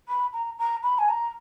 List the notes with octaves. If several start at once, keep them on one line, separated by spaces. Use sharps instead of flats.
B5
A#5
A#5
B5
G#5
A#5